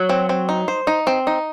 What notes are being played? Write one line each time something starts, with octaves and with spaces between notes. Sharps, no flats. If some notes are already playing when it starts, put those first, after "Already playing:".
Already playing: F#3
C4
C4
D#4
C5
D#4
C4
D#4